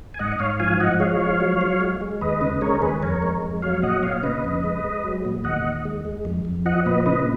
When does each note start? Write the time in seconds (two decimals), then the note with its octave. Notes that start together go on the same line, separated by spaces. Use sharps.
0.14 G#5
0.19 G#2 D#5 F#5
0.32 D#5
0.39 G#2 C#5 F5
0.60 F3 F5 G#5
0.80 F3 D#5 F#5
1.00 G#3 C#5 F5
1.20 F3
1.41 F#3
1.61 F#3
1.81 G#3
2.01 G#3
2.21 D#2 B4 D#5
2.41 C#3
2.61 G#3 A#4 C#5
2.82 D#2 G#4 B4
3.02 F2 A#4 C#5
3.22 G#3
3.42 F2
3.62 F#3 C#5 F5
3.83 A#2 D#5 F#5
4.03 A#2 C#5 F5
4.23 C#3 B4 D#5
4.44 F2
4.64 G#3
4.84 G#3
5.04 F#3
5.25 A#2
5.44 D#2 D#5 F#5
5.64 D#2
5.85 G#3
6.05 G#3
6.25 F2
6.45 F2
6.66 F3 D#5 F#5
6.86 A#2 B4 D#5
7.06 C#3 B4 D#5